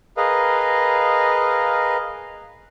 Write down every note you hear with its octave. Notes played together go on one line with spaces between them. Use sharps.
G#4 A#4 B4 D#5 F5